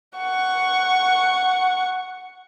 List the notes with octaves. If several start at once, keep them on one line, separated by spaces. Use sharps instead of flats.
F#5 C#6